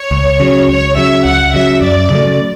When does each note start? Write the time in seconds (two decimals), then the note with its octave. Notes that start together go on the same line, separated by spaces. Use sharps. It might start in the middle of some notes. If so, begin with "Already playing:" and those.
Already playing: C#5
0.11 C#2
0.40 C#3 F#3
0.69 C#2 C#5
0.97 C#3 F#3 E5
1.25 C#2 F#5
1.54 C#3 F#3 E5
1.82 F#2 D5
2.10 C#3 F#3 A3